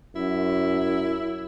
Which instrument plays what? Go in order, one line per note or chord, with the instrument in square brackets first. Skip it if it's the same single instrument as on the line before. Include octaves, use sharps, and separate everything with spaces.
[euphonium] F#2 [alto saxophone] E4